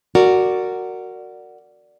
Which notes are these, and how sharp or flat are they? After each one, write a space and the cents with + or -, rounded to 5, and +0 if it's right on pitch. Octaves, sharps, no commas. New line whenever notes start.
F#4 +0 A#4 -20 D5 +0